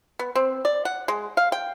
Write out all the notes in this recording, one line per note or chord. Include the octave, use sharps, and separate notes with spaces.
B3
C4
D5
F#5
G#3
F5
G5